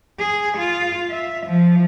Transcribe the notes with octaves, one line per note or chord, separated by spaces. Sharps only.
G#4
F4
E5
F3